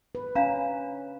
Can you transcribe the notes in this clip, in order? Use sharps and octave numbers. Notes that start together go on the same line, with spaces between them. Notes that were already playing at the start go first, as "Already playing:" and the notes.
B4
C#4 D4 F5 A#5